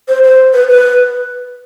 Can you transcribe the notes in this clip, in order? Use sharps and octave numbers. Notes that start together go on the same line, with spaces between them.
C5
C5
B4
B4